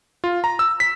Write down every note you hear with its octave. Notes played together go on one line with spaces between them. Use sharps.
F4
A#5
E6
B6